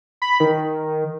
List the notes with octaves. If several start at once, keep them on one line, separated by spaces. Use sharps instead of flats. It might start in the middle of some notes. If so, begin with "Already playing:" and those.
B5
D#3